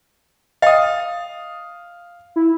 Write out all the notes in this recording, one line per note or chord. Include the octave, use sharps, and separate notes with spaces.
D#5 F5 G5 D#6
E4